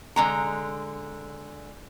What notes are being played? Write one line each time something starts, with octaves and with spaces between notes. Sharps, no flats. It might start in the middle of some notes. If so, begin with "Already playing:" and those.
D3 G#3 A#5